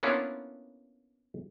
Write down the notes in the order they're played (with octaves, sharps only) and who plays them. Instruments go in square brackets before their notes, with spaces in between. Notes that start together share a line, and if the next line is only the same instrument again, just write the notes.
[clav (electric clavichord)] A#3 B3 C#4 D4 E4 F4